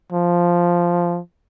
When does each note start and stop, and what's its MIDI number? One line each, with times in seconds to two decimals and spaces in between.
0.12 1.19 53